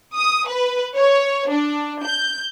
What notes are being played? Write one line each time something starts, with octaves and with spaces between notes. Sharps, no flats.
D#6
B4
C#5
D4
G6